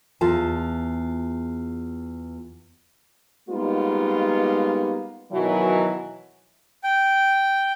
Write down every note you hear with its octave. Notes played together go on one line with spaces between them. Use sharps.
E2 F4 A5
G3 G#3 A#3 B3 D#4 F4
B2 D#3 E3 F#3
G5